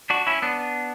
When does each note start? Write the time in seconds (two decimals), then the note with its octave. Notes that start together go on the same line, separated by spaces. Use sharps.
0.10 D4 F#4
0.27 C#4 E4
0.42 B3 D4